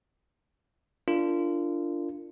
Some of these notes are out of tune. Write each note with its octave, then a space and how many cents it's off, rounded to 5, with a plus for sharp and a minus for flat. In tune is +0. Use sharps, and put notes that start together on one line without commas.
D4 +0 F4 -25 A#4 -30